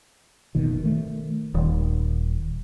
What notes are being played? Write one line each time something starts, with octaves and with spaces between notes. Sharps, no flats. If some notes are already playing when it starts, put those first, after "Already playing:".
F#1 B2 D#3
D#3 A3
D#1 D#3